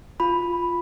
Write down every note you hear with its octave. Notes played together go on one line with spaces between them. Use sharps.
F4 B5